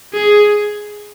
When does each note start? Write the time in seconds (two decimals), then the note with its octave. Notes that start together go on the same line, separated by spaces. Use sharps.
0.13 G#4